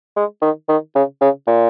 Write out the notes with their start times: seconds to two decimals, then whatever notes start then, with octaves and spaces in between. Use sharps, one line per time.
0.17 G#3
0.42 D#3
0.69 D#3
0.95 C#3
1.21 C#3
1.47 A#2